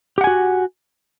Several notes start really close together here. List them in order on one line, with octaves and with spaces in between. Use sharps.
G4 F#5 G#5 F#4